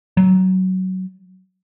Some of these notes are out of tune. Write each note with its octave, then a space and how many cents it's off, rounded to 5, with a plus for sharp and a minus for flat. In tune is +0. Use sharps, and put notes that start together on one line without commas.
F#3 +15